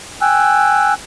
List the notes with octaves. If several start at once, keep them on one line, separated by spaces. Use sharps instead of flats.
G5 G#5 E6 F#6